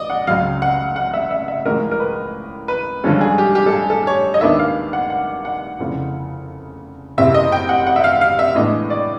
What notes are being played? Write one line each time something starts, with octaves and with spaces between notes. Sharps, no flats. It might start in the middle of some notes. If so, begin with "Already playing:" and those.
Already playing: D5 D#5
F#5
C#2 C#3 F#3 F5
F#5
F#5
E5
E5
E5
A1 A2 F3 G#3 A#4
A#4
B4
B4
G2 D3 F3 G#3 C#4 A4
G#4
G4
G4
A4
G#4
A4
C#5
D#5
D#2 D#3 G#3 B3 D4 E5
F5
F#5
F#5
F#5
F1 E2 C#3 F3
F#1 E2 C3 E5
D#5
G5
F#5
F#5
E5
F5
F5
E5
A2 E3 G#3 B3 D4 D#5
D5